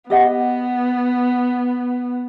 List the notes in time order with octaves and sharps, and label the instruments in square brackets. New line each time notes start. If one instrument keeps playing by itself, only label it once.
[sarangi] B3 [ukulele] G4 D#5 F#5